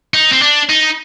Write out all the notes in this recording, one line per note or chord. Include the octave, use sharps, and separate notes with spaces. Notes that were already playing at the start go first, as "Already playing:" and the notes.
D#4
C4
D4
D#4